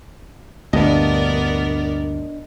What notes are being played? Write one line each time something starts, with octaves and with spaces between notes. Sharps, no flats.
D2 G2 A#2 B3 D4 A#4 D5 D#5